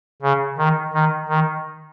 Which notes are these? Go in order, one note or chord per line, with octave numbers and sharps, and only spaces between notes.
C#3
D#3
D#3
D#3